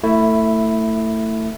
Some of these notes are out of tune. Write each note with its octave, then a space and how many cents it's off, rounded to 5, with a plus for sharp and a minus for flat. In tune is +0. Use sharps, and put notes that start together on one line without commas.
A3 +20 E4 +0